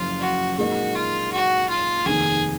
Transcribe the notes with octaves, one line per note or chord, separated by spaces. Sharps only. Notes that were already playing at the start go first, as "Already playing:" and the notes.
Already playing: F#1 F#2 F3 F4
F#4
A#2 G#3 D#4 F#4 A#4 D#5
F4
F#4
F4
F1 D#2 D#3 G#4